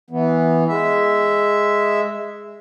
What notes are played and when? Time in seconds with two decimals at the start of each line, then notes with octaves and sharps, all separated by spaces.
0.10 E3 B3
0.68 G#3 E5